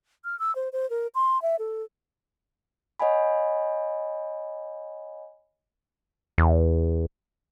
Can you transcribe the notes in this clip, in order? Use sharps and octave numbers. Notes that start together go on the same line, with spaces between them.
F6
E6
C5
C5
A#4
C6
E5
A4
C#5 D#5 F#5 G#5 B5
E2